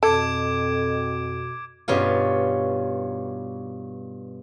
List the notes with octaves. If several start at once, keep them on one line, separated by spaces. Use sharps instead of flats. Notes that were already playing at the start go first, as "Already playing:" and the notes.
F2 B2 A4 D6 G#6 D7
G2 B2 C#4 F4